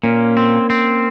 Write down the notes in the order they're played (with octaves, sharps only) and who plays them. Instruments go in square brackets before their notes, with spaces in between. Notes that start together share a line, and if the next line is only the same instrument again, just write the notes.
[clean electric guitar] A#2 [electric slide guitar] A#3 C#4
[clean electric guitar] C4
C4